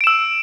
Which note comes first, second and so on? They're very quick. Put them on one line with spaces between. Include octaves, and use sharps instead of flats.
D7 E7 E6